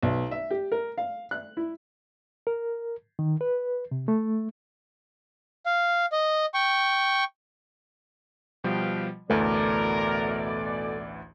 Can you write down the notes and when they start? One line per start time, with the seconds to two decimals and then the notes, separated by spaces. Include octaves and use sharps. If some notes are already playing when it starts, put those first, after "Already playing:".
0.03 B1
0.31 E5
0.51 G4
0.72 A#4
0.98 F5
1.31 F#6
1.57 E4
2.47 A#4
3.19 D#3
3.41 B4
3.91 C3
4.08 A3
5.66 F5
6.12 D#5
6.54 G5 C#6
8.64 B2 F3 G3 B4 F5 G5
9.30 A1 D2 B2 E3 A3 A#4 D5